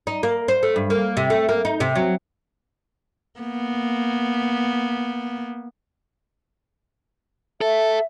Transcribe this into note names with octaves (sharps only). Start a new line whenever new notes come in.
D#4
A#3
C5
A3
G2
A#3
C3
A3
A#3
D#4
C3
F#3
A#3 B3
A4 E5